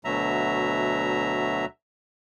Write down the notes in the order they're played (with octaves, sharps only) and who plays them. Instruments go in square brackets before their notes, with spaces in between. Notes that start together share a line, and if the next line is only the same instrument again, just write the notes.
[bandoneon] D2 B2 F#3 E5 A#5